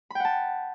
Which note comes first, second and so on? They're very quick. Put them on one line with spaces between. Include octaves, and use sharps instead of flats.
B5 G5 F#5 A5